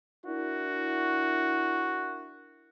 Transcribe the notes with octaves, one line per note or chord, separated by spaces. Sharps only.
D4 E4 F#4 A#4